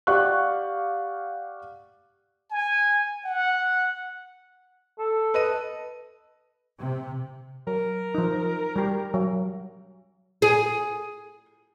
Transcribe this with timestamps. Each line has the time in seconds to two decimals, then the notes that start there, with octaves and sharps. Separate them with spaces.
0.07 G4 D5 F5 F#5 C#6 F#6
2.51 G#5
3.25 F#5
4.99 A4
5.34 B4 D#5 D#7
6.78 C3
7.67 F#3 A#4
8.15 F3 D#4
8.76 G3 G4
9.14 F#3
10.42 G#4